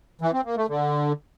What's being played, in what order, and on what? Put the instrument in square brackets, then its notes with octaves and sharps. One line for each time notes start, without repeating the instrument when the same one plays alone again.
[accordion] E3
C4
A#3
A3
D3